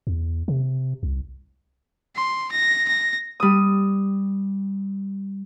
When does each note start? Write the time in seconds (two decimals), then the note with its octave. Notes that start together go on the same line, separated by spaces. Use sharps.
0.07 E2
0.48 C3
1.03 C2
2.16 C6
2.52 A#6
2.88 A#6
3.40 G3 D#6